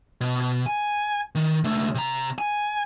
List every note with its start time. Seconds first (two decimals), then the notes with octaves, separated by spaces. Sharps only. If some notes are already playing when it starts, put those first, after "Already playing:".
0.21 B2
0.66 G#5
1.35 D#3
1.64 C#2 A3
1.95 C3 A#5
2.38 G#5